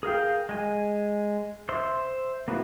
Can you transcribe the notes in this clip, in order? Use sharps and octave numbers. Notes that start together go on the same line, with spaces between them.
G#4 A#4 F5 G5
G#3 G#5
C5 E5 C6
A#3 B3 E4 F#4